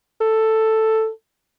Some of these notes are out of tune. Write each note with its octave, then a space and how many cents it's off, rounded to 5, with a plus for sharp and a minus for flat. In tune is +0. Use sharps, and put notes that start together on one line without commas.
A4 +5